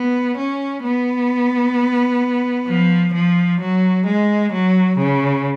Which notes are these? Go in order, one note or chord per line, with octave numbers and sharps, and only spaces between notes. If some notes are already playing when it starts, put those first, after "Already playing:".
Already playing: B3
C#4
B3
F3
F3
F#3
G#3
F#3
C#3